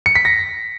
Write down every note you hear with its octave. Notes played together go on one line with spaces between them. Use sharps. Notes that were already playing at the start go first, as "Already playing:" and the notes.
C#7
B6
A#6